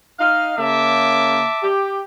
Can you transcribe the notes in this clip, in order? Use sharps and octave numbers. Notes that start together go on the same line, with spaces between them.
D#4 D#5 F5
C#3 A#3 E5 A5 D6
G4